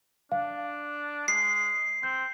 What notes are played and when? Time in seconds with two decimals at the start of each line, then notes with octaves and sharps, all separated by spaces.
0.32 D4 F5
1.28 G#3 C7
2.03 C4 G6